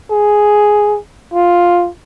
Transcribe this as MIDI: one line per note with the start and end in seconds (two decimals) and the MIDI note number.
0.11 0.98 68
1.34 1.89 65